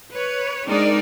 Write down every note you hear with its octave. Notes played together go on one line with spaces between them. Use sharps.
B4 C#5
G#3 C4 D4 D#4 A#4 D5